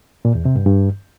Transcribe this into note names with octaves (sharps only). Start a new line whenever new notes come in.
A#2
E2
C3
G2
G2